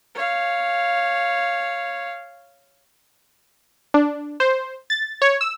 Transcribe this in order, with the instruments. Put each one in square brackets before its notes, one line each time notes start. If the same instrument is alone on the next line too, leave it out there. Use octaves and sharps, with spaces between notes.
[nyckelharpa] C#5 F5
[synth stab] D4
C5
A6
C#5
E6